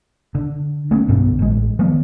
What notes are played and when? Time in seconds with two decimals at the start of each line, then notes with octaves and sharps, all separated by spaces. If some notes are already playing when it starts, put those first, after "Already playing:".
0.35 D3
0.91 A3 B3 C#4
1.08 B1 G2 D3 B3
1.39 A1 G#3
1.79 D#3 F3 G#3 B3